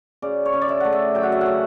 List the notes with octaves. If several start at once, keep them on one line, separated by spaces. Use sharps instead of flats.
C#3 D5
C#5
C#3
D5
E5
A3 F#5
E5
F#3 G5
F#5
E5
F#5
C#3